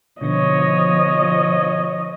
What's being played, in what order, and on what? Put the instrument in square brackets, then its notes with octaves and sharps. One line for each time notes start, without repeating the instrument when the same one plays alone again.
[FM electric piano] B2 D3 B3 [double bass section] F3 [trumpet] C#5 [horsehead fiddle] D#5